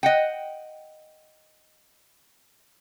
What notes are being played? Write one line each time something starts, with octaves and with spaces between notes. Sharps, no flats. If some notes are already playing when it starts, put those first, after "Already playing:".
D#5 F#5 G5